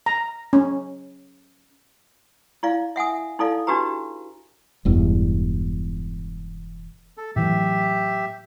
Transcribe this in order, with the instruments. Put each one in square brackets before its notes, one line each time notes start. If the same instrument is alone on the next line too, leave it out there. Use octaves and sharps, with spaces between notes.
[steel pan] A#5
C#4
[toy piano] E4 D5 F5
E5 F#5 G#5 D#6
D#4 E4 A4 D5 F5
D4 D#4 F#4 G4 B4 A#5
[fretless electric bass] E1 E2 G2
[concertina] A4
[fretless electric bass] A2 E3 F#3 [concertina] G4 E5